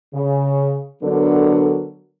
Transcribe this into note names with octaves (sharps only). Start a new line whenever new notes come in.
C#3
D3 F#3 B3 D4 A4 A#4